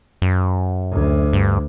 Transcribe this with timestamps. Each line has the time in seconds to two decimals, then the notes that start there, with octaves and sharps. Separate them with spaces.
0.22 F#2
0.91 D2
1.33 G2